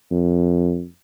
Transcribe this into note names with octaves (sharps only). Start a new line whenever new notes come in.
F2